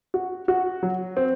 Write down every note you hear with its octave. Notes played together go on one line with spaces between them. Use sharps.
F#4
F#4
F#3
C4